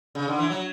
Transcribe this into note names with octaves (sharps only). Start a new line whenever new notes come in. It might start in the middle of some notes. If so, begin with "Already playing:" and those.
C#3
D3
E3
F#3